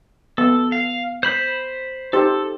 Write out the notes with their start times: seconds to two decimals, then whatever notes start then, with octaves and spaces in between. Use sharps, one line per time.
0.38 B3 A4
0.72 F5
1.23 C5 B5
2.13 D#4 G4 A4 C5